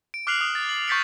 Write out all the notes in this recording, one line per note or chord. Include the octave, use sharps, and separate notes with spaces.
D7
D6 F6 F#6 C7 F7 F#7
D#6
A6
F#7
C#6 G6 A6 B6 C#7 D7